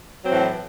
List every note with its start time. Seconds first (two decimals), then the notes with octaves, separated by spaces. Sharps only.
0.23 F#3
0.26 C4
0.30 E3
0.33 A2